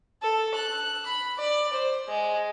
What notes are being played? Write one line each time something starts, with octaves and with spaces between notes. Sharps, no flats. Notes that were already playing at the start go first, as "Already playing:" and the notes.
A4
F#6
B5
D5
C5
G#3